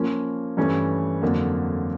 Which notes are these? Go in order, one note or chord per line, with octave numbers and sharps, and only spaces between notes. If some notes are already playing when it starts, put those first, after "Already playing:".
Already playing: F3 A#3 C#4
G2 E3 A3 C#4
F2 D3 F#3 A#3